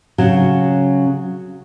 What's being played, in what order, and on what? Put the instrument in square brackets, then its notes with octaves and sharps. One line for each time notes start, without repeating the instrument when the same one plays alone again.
[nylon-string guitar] C#3 F#3